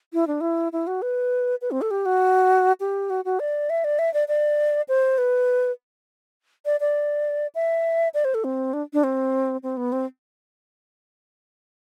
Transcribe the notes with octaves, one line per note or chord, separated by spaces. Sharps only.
E4
D4
E4
E4
F#4
B4
B4
C4
A4
G4
F#4
G4
F#4
F#4
D5
E5
D5
E5
D5
D5
C5
B4
D5
D5
E5
D5
C5
A4
C4
D4
D4
C4
C4
B3
C4